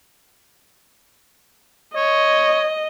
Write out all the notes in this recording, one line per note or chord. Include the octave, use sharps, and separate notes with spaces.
C#5 D#5